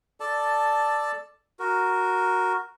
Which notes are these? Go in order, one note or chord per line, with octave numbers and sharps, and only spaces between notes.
A4 D5 A5
F#4 A#4